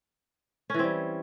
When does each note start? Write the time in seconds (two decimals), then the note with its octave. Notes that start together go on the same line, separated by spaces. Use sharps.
0.70 C#4
0.74 E3
0.79 C4
0.84 G3